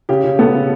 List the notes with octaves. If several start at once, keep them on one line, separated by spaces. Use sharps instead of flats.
C#3 G4
C#3
B3 A4
C#3